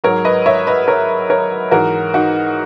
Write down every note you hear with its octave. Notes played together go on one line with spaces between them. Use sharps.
G#2 F#3 A#4 C#5
B4 D#5
C#5 E5
B4 D#5
A#4 C#5
A#4 C#5
G#2 E3 F#4 A#4
D#4 F#4